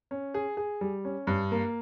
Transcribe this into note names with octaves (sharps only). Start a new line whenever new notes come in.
C#4
G#4
G#4
G3
C#4
G2
A#3